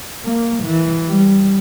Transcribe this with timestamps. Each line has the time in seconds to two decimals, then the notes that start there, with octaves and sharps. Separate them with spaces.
0.24 A#3
0.64 E3
1.08 G3